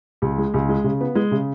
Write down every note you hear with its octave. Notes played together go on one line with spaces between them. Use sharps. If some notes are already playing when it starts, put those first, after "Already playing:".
C#2
G#3
C#2
G#3
C#3
B3
G#3
C#3